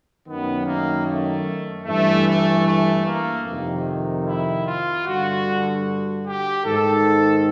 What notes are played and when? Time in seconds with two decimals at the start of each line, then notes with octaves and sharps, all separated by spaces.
0.25 F#2 D#3 B3
0.65 A#3
1.05 A3
1.85 G2 E3 A3
2.25 A3
2.65 A3
3.05 A#3
3.45 F2 C3 D#3
4.25 E4
4.65 F4
5.05 G2 D3 F#4
6.25 G4
6.65 G#2 D#3 A4